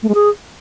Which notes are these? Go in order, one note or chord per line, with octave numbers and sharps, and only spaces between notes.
A3
G#3
G#4